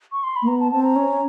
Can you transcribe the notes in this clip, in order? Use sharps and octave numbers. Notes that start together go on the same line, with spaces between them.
C#6
C6
B5
A#3
B3 A#5
A5
C4 A5
A#5
C#4